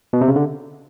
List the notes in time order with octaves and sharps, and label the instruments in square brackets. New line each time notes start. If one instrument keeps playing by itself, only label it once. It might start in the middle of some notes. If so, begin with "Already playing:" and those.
[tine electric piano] B2
C3
C#3
D3